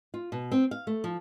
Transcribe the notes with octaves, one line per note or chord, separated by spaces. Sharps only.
F4
B2
C4
F5
A3
F3